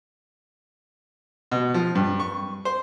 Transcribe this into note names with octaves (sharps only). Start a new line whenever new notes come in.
B2
F3
G2
C#6
C5